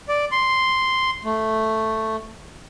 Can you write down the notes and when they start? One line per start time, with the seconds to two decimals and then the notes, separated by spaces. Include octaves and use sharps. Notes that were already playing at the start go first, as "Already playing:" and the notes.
0.08 D5
0.32 C6
1.25 A3